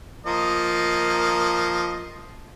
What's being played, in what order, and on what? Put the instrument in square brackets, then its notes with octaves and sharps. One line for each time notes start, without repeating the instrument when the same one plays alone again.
[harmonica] F3 A#3 D#5